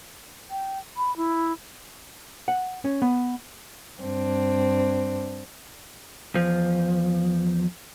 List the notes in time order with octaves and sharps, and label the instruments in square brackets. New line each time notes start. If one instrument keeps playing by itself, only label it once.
[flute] G5
B5
E4
[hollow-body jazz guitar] F#5
C#4
B3
[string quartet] G2 C4 D4
[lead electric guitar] E2 F3